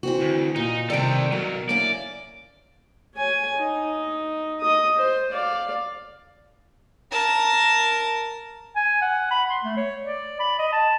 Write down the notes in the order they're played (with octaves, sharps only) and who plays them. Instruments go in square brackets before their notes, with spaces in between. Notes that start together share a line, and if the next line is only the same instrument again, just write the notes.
[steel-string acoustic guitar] E3 C4 F#4
[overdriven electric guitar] D2
[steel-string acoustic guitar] A#2 [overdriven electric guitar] D#4
[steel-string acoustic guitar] C3 D#3 G3 [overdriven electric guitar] A4 G5
[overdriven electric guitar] B2 F#3 [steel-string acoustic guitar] A#4
[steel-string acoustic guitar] A#3 C#4 E4 [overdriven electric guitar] D5
[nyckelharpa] C#5 G#5
D#4
D#5 D#6
C5
D5 F5
[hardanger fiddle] A#4 A5
[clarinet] G#5
F#5
B5
C6
A3
C#5
D5
B5
D#5
A5